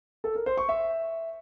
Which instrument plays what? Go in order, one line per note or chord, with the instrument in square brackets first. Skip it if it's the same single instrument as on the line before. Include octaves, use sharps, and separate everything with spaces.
[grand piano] A4
A#4
C5
C#6
E5